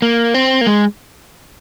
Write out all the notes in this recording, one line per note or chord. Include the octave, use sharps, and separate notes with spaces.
A#3
C4
A#3
G#3